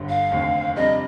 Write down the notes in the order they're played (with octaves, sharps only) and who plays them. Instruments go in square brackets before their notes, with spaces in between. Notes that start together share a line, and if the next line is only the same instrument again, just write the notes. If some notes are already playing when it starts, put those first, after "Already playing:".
Already playing: [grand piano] G1 G2 D3
[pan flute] F5
[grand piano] F1 D#2 D3
[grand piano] F2 C3 G3 D4 [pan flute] D#5